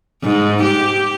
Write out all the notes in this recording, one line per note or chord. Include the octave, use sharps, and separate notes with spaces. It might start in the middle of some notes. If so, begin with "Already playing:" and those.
G#2
G4